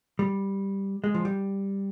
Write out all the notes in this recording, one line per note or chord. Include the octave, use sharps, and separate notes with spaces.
G3
G#3
F3
G3